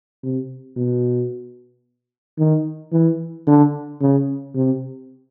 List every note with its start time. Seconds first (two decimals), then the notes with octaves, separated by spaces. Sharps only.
0.23 C3
0.76 B2
2.39 D#3
2.93 E3
3.47 D3
4.01 C#3
4.55 C3